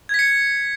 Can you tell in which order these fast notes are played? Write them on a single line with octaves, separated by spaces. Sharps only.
G#6 B6 C#7